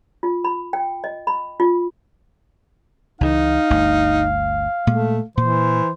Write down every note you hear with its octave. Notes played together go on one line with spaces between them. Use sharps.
F4
B5
G5
D#5
B5
F4
C#2 C#3 E3 D#4 F5
G1 D2
A#2 G#3 A3
A#2 E3 C5